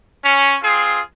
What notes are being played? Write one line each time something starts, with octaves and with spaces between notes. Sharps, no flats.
C#4
C4 F4 G#4